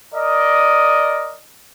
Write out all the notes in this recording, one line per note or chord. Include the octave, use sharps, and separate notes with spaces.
A#4 D5 D#5